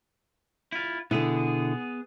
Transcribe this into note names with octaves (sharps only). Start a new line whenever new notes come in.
E4 F4
B2 D3 B3 E4 G#4